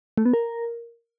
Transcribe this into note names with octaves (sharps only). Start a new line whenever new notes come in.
A3
B3
A#4